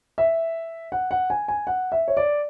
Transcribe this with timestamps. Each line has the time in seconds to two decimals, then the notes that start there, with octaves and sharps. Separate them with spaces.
0.18 E5
0.92 F#5
1.11 F#5
1.30 G#5
1.48 G#5
1.67 F#5
1.92 E5
2.08 C#5
2.17 D5